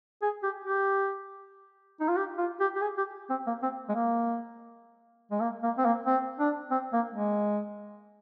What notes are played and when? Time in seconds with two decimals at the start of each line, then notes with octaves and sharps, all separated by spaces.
0.22 G#4
0.43 G4
0.65 G4
2.01 D#4
2.08 F4
2.17 G4
2.38 F4
2.60 G4
2.76 G4
2.82 G#4
2.98 G4
3.30 C4
3.47 A#3
3.63 C4
3.89 G#3
3.95 A#3
5.31 G#3
5.41 A#3
5.63 A#3
5.78 C4
5.85 A#3
6.07 C4
6.39 D4
6.71 C4
6.93 A#3
7.14 G#3